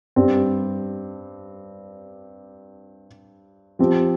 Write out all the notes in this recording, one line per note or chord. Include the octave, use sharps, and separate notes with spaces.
G2 G3 C4
F3 C4 G4